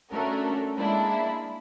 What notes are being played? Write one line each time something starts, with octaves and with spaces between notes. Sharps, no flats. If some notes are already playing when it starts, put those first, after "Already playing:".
A3 C#4 D4 F#4 A4 A#4
G#3 A#3 D4 E4